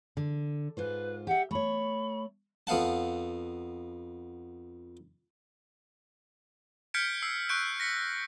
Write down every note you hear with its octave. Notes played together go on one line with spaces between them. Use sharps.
D3
G#2 F4 B4 C5
G4 E5 F#5
A3 C#5 B5
F2 B3 F5 F#5 A5
F6 G6 G#6 B6 C#7 D7
E6 C7
C#6 F#6 G6 D7
A#6 B6 C#7